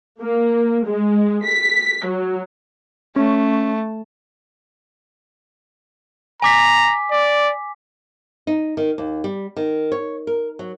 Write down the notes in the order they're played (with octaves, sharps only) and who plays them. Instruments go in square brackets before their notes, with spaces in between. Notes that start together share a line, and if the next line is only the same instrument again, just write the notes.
[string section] A#3
G#3
B6
F#3
[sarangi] A3 [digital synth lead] C#4
[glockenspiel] G#5 D6 B6 [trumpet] A#5
[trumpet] D5
[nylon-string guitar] D#4
D#3
D#2
G3
D#3
C#5
A#4
F#3